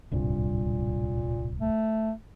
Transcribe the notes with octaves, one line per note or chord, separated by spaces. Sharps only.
D1 C2 G2 A#2
A3